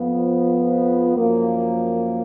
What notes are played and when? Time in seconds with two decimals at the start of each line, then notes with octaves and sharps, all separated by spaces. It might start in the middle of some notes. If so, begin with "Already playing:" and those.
Already playing: F2 F3 B3
1.15 F#2 F3 A#3